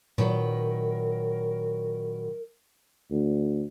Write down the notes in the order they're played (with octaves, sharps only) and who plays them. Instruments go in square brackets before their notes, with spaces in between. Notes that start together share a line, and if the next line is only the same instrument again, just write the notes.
[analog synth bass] A#2 [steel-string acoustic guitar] D#3 F#3 B4 [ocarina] A#4
[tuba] D2